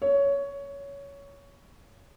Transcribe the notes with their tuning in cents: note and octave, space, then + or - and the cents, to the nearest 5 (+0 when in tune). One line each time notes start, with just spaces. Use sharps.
C#5 +15